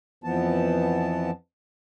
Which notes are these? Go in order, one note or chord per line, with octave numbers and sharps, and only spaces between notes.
F2 E3 F3 B3 A5